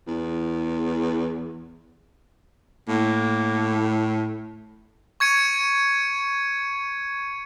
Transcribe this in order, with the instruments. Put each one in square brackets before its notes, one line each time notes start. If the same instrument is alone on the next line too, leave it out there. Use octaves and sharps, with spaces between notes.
[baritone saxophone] E2
[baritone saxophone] A2 [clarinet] A#3
[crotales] C#6 G#6 C#7 D#7